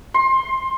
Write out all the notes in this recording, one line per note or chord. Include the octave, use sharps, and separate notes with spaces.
C6